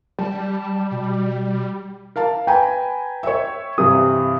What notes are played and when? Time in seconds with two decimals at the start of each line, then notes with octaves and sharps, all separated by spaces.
0.19 G3 A5
0.91 B2
2.16 A#4 F5 A5
2.47 B4 G5 G#5 A#5
3.23 C#5 E5
3.78 G2 C3 E3 D#6